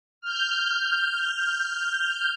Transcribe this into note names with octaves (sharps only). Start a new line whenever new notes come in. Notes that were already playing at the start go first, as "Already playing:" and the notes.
F6 G6